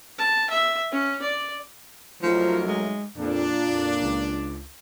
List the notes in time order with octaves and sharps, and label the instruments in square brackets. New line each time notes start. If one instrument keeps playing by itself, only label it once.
[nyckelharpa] A5
E5
C#4
D5
[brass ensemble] C2 A#4 [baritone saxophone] F3 [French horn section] F#3 A3 D#4
[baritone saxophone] G#3
[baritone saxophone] F2 [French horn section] A#2 [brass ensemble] D4
[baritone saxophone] F2
C#2